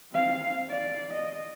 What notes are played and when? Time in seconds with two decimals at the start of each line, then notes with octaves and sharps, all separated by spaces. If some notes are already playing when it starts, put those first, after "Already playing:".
0.13 C4 F5
0.70 D5
1.14 D#5